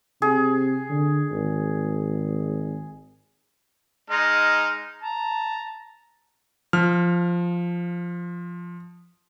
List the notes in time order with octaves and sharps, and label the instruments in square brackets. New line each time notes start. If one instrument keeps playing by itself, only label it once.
[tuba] C3 [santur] G#4
[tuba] D3
G#1
[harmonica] G#3 D#4 F6
A5 A#5
[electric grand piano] F3 F6